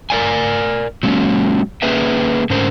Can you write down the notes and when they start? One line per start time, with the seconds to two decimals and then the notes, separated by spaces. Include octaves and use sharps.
0.10 A#4 C5 D5 F5 G#5
1.03 F#3 G#3 A#3 C#4
1.82 A#3 C#4 G#4 B4 E5 G5
2.50 G#2 D3 C#4 A#4 C5